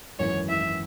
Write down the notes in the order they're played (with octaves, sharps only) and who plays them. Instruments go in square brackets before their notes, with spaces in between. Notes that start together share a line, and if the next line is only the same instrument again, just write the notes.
[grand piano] G#1 F#2 E3 [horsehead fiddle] C#5
[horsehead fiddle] E5